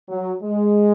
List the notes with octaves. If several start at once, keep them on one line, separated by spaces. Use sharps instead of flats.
F#3
G#3